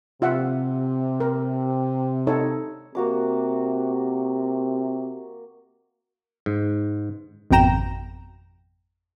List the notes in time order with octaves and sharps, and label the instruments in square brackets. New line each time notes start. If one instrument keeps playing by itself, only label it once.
[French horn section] C3 [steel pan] F4 E5 F#5
[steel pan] A#4
D#4 A4 C#5
[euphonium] C3 [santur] A#3 F#4 D6
[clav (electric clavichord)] G#2
[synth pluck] G#1 F2 B2 G5 A#5 E7